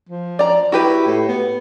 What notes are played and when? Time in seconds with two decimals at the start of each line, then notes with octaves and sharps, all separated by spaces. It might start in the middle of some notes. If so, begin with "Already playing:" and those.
0.09 F3
0.39 D5 A#5
0.72 E4 F#4 G4 B4
1.07 A2
1.28 B3